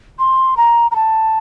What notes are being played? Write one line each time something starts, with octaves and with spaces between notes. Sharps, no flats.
C6
A#5
A#5
A5